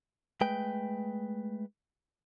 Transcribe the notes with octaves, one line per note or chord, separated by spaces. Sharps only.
G#3 A3 B4 G5